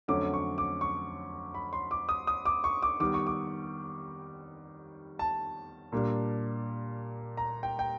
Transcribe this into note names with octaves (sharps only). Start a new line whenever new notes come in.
F2 D3 F#3 A3 C#4 D6
C#6
D6
C#6
B5
C6
D6
D#6
D#6
D6
C#6
D6
D#3 G3 B3 D6
C#6
D6
A5
A#2 G3 A#3 D4
A#5
G5
G5